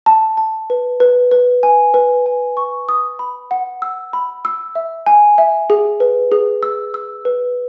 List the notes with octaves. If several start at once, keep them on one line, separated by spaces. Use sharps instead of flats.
A5
A5
B4
B4
B4
G#5
B4
G#5
C#6
D#6
B5
F#5
E6
B5
E6
E5
G#5
E5
G#4
B4
G#4
E6
E6
B4